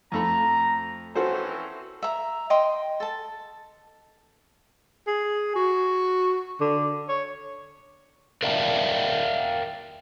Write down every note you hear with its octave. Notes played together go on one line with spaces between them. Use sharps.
F2 A3 A#5 B5
E3 C4 C#4 F#4 A4 C5
E5 A#5
D#5 G5 C6 D#6
A4 A5
G#4
F#4
D3
C#5
A#4 D5 E5 F5 G5 A5